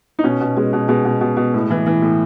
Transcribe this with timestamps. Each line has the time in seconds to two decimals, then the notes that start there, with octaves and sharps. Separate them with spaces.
0.19 D#4
0.24 B2 C#4
0.41 B2
0.57 B2 G#3
0.73 B2
0.88 B2 G#3
1.05 B2
1.21 B2
1.37 B2
1.54 A2
1.70 E3
1.86 E3
2.02 A2